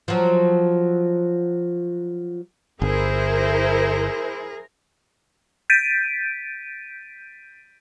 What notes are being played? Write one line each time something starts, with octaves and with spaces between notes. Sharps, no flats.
F3 F#3
G1 E4 G#4 A#4 C5
G6 A6 B6 D7 D#7